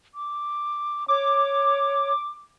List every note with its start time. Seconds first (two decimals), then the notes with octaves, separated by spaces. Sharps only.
0.15 D6
1.08 C#5 D6